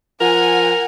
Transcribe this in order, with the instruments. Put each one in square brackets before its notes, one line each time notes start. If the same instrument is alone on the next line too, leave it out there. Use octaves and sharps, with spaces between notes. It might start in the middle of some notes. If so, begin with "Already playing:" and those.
[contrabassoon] F3 [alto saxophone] A#4 [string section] F#5 G#5